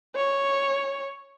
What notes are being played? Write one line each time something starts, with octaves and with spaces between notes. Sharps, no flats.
C#5